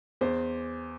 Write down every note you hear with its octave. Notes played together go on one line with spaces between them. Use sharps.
E2 C5